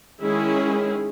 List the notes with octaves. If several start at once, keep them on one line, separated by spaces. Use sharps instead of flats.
D#3 G#3 C#4 E4 G#4